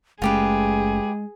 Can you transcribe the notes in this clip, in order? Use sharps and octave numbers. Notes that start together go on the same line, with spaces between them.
F#1 G#3 A3 C#4 F4 G4 G#4 B4